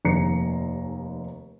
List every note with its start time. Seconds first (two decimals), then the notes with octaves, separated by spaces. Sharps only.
0.05 F1 D#2 A#5 C7 C#7